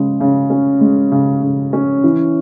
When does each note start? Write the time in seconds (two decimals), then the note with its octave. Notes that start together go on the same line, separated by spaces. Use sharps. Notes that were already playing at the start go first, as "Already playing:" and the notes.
Already playing: C#3 G#3
0.20 C#3
0.50 C#4
0.81 G#3
1.12 C#3
1.43 C#3
1.73 C#4
2.04 E3